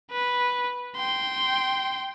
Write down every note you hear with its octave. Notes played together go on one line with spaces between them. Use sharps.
B4
G5 C6